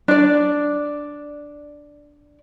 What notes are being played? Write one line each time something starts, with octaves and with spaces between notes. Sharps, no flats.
D4 D5